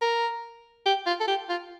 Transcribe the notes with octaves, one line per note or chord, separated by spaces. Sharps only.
A#4
G4
F4
A4
G4
F4